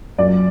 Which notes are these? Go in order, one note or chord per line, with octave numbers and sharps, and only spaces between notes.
F#2 D5